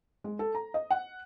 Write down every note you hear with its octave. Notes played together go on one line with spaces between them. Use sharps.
G#3
A4
A#5
D#5
F#5